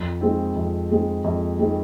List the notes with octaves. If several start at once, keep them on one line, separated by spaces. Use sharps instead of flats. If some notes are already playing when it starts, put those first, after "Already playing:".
Already playing: F2
D#3 G#3 C4
F2
D#3 G#3 C4
F2
D#3 G#3 C4